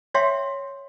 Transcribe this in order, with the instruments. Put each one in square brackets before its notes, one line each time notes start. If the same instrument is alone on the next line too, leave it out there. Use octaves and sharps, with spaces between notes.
[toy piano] C#5 E5 F5 G5 C6